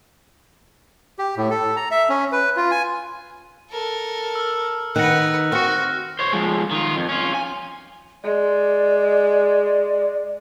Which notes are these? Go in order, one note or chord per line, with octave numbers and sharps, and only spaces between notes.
G4
A2
A4
A#5
E5
C#4
B4
F4
G#5
A4 A#4
E6 F6
D#3 B4 F#5 F#6 A#6
C4 F#4 F6
C5 C#5
F3 G#3
D#3 F4
F2
C#4 F4
G#5
G#3 D5